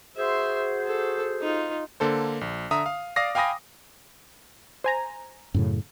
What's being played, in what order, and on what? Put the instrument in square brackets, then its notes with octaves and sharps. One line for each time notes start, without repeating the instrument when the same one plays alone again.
[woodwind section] F#4 G#4 C5 [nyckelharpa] E5 C6
[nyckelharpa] A4
D#4 F4
[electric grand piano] D3 A#3 A4 C5
A#1
D3 E5 A#5 D#6
F5
D5 F5 D6 D#6 A#6 C7
F5 G5 G#5 B5 D#6 A#6
[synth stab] C5 G#5 A#5
[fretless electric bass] F#2 A2 C#3